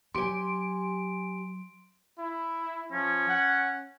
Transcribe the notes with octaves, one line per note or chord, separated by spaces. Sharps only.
F#3 G4 G#5 C6 D7
E4
F3 C#4
F#5